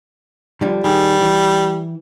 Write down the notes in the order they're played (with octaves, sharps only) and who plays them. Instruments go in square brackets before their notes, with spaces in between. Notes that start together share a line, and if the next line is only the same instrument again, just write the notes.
[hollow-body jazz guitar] D3 F3 G3
[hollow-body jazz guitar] D#3 G#4 [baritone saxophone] G3
[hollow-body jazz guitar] E3